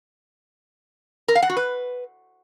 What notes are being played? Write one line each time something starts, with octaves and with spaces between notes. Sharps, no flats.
A#4
F5
F#5
F#4
B4